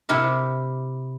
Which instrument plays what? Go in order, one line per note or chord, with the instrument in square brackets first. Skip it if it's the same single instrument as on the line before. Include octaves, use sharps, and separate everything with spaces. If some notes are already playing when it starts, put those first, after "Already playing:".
[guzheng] C3 E4 G4 A#4